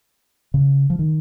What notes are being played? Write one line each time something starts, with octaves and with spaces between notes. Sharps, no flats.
C#3
F3
D#3